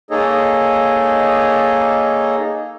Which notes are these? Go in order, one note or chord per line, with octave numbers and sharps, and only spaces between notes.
A#3 D#4 G#4 A4 C#5 D#5